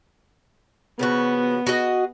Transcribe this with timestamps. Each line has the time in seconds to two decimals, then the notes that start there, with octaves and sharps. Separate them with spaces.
0.99 C#3 F3 B3 F#4
1.67 F#4 G#4 D#5